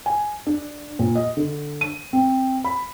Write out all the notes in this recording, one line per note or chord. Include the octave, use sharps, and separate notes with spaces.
G#5
D4
A#2
D#5
D3
D#7
C4
B5